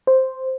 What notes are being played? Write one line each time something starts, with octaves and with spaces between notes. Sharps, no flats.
C5